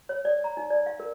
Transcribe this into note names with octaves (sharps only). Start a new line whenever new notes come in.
C#5
D5
A#5
D#4
D5
F5
A#4